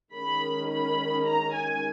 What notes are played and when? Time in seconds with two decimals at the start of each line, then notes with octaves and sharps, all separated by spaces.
0.13 D#3 G#3 C#4 B5
0.69 B5
1.25 A#5
1.54 G#5